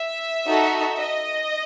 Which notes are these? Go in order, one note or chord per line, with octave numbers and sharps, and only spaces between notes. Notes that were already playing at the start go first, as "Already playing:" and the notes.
Already playing: E5
D#4 F#4 A4
D#5